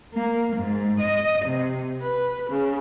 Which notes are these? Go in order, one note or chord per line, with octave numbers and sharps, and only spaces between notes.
A#3
G#2
D#5
C3
B4
C#3